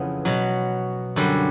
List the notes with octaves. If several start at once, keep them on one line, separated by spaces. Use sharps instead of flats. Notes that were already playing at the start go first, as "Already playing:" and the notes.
Already playing: F2 C#3 E3 B3
B2 F#3
F#2 D3 G3